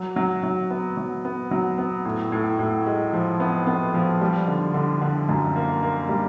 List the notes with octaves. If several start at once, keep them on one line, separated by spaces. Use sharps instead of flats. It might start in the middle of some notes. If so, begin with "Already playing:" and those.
Already playing: F#3
F#3
F#3
B3
F#3
B3
F#3
B3
A2
A2
A2
G#3
F3
B3
B3
F3
G3
D3
D3
D3
F#2
A#3
A#3
G3